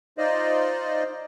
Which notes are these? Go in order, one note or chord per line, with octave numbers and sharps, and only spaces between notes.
D#4 F4 C5 D5 D#5